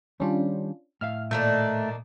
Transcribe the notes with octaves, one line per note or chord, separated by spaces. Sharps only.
D#3 G3 C#4 D4 F4
A2 E5 F5 F6
A#2 D#3 A3 A#3 D4